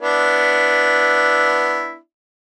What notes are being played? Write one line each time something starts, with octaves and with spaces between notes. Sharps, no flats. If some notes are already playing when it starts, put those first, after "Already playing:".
B3 D4 E4